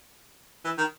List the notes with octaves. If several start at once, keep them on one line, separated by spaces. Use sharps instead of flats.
E3
D#3